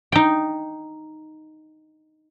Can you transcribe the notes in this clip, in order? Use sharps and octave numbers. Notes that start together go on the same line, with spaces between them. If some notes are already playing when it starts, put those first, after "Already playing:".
D#4 G5